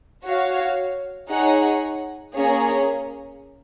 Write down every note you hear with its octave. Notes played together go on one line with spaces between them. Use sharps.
F#4 C#5 F5
D#4 G#4 C#5 F#5
A#3 C#4 G#4 C#5